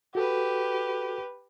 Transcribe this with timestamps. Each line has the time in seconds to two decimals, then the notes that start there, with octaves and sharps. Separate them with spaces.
0.15 F#4 G4 A4 B4